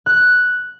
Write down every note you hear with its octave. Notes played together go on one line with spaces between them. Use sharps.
F#6